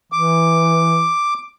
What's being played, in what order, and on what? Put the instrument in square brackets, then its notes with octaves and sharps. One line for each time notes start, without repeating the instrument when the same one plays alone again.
[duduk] E3 [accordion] D6